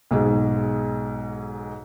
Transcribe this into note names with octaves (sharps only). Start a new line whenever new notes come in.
B1 G#2 G#4